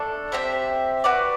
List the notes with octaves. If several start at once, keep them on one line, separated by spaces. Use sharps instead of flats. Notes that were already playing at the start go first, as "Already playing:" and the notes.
Already playing: A3 D4 A4 D5
C4 G4 C5 E5
F#4 B4 D5